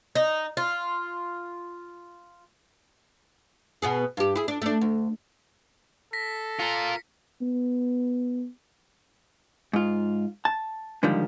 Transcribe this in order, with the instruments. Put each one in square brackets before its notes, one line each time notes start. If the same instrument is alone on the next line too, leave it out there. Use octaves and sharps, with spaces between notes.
[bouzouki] D#4
F4
[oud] B2 B3 G#4
G2 G4
E4 G#4
D4
A3 D4
D2
[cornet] A4 [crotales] A#6 B6
[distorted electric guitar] F4 A#4 [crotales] C#7
[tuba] B3
[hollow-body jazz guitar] G#2 F4
A5
G#2 D3 D#3 F3 G3